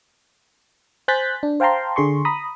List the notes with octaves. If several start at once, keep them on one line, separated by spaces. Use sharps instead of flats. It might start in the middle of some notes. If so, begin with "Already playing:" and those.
C5 G#5 F#6 G6 A6 B6
D4
C5 F5 G5 A5 A#5 C6
D3 G#4 C6 C#6
A#5 B5 D#6